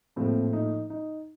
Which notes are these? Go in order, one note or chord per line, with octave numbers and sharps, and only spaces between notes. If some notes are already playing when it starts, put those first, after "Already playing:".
A#1 A2 F3 C4
D#4
D#4